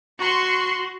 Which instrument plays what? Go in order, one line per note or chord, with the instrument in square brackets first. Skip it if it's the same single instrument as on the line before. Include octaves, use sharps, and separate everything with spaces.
[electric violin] F#4 [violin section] C6 C#6